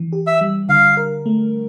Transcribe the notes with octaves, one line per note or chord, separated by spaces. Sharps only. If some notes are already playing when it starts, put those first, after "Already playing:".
Already playing: E3
G4
E5
G3
D3 F5
A#4
A3